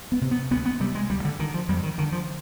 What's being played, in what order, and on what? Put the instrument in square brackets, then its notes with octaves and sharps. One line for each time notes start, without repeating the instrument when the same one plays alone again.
[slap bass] B3
C3
B3
D2 B3
B3
C3 G3
G#3
D2 G3
D3
D3 D#3
F3
F2 G3
D#3
D3 D#3
F3